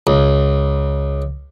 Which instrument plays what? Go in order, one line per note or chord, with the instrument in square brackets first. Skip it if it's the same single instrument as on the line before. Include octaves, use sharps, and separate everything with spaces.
[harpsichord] C#2